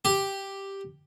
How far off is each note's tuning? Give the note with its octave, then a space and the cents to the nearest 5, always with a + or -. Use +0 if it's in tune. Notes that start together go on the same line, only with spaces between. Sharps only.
G4 +0